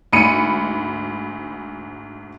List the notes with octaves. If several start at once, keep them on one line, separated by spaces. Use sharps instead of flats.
D2 G#2 B5 C#7 D#7